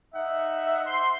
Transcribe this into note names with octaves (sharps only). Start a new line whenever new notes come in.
D#4 E5 F#5
C5 C6